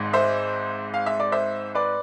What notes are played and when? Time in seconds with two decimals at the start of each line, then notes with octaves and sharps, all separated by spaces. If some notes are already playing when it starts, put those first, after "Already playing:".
Already playing: G#1 G#2 G#3
0.13 C5 E5
0.94 F5
1.06 E5
1.20 D5
1.32 C5 E5
1.75 B4 D5